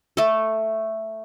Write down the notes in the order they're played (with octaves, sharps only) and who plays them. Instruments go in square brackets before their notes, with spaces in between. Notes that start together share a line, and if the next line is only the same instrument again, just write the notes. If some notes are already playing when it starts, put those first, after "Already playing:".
[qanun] A3 A4